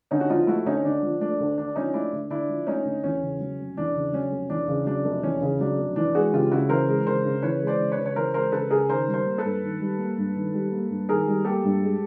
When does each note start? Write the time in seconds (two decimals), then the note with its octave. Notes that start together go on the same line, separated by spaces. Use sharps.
0.11 D3 C#4 D#4
0.20 F#4
0.30 F3 D#4 F4
0.47 A3 E4 F#4
0.65 D2 C#4 D#4
0.84 D3 D4
1.03 F3
1.21 A3 D4
1.40 D2
1.57 D3 D4
1.76 F3 C#4 D#4
1.94 A3 D4 E4
2.13 D2
2.30 D3 D4 E4
2.49 F3
2.67 A3 C#4 D#4
2.85 D2
3.03 E2 C#4
3.22 C#3
3.40 F#3
3.59 F1
3.77 E2 D4
3.96 C#3
4.13 F#3 C#4
4.32 F1
4.50 E2 D4
4.68 C#3
4.86 F#3 D4
5.05 F1
5.23 E2 C#4
5.42 C#3
5.60 F#3 D4
5.78 F1
5.96 E3 D4
6.15 G#3 F#4 G#4
6.33 C#3 F4 G4
6.51 C#3 E4 F#4
6.69 E3 A#4 C5
6.88 G#3
7.06 C#3 A#4 C5
7.25 C#3
7.42 E3 B4 C#5
7.61 G#3
7.67 C5 D5
7.79 C#3
7.92 B4 C#5
7.98 C#3
8.06 C#5
8.16 E3 A#4 C5
8.34 G#3 A#4 C5
8.52 C#3 A4 B4
8.70 C#3 G#4 A#4
8.89 D#3 A#4 C5
9.07 G3
9.13 A#4 C5
9.26 A#3
9.38 A4 B4
9.44 G2
9.63 D#3
9.80 G3
9.99 A#3
10.18 G2
10.35 D#3
10.54 G3
10.72 A#3
10.90 G2
11.09 D#3 G#4 A#4
11.27 G3
11.45 A#3 G4 A4
11.64 G2
11.82 G#3